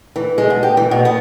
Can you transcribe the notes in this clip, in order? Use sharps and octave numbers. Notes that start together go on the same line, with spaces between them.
E3
G#3
B2
G4
E3
B2
B3